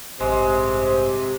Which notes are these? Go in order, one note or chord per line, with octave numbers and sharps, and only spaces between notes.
A1 G2 C3 G#3 C5